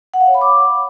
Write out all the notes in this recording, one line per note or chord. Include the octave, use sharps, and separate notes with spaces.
F#5
F5
C#5
B5
D6